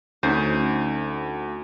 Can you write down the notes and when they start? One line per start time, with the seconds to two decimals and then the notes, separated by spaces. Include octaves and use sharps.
0.23 D2 C#4 D#4 C5